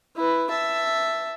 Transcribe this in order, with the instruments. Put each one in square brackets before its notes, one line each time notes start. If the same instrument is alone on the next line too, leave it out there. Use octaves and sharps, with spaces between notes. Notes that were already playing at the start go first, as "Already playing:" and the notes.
[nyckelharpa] E4 B4
E5 A5